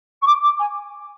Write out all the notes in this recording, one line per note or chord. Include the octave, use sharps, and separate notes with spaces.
C#6
D6
D6
G#5